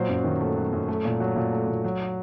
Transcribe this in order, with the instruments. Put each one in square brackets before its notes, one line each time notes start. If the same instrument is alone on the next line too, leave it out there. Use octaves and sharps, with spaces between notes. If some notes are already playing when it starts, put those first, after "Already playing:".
Already playing: [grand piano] A#2 F#3 C5
F#2
D#3
A3
F#3
F#2
A3
A#2
F#3
A#2
A3
A#2
F#3